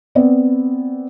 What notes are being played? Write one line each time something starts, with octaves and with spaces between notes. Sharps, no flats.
B3 C4 D5